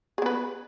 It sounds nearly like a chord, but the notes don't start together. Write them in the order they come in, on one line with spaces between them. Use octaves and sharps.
G#4 B3 B4